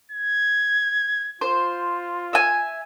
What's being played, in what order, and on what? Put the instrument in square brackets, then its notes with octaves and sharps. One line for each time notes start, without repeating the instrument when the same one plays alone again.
[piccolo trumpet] G#6
[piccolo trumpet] F4 [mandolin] C5
[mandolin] E5 G#5